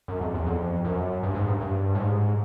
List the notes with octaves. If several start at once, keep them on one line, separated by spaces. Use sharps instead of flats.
F#2
F2
E2
F2
F#2
G2
G#2
G2
G2
A2
G#2